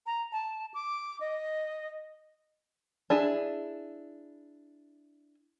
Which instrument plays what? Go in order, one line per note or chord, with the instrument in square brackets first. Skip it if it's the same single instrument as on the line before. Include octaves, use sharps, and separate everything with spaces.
[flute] A#5
A5
D6
D#5
[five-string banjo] D4 E4 G#4